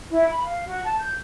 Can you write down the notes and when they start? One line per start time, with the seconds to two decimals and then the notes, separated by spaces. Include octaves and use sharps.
0.10 E4
0.29 B5
0.43 F5
0.65 F#4
0.84 A5
0.99 G6